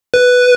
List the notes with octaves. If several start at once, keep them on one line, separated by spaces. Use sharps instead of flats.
B4